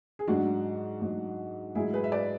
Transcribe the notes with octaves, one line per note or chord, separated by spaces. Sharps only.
G#4
G#2 F#3 D4 F#4
G#2 F#3
G#2 F#3 E4 G#4
G#4 B4
E5
B4 D5